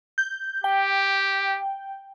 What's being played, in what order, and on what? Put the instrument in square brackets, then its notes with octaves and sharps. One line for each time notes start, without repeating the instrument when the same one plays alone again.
[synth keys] G6
[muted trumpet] G4 [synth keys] G5